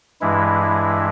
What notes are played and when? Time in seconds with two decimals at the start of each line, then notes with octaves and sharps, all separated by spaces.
0.21 G2 E3 G#3 E4
0.63 E4